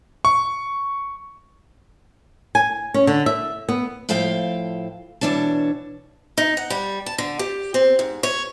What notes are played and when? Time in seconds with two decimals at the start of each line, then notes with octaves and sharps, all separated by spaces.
0.25 C#6
2.55 G#5
2.94 C#4
3.07 D3
3.26 E5
3.69 B3
4.09 A2 F3 E5 F5 G5
5.21 B2 E3 D4 C#5 A5
6.38 D#4
6.57 F#5
6.70 G3
7.06 A5
7.18 D3
7.39 G4
7.74 C4
7.99 G#2
8.23 C#5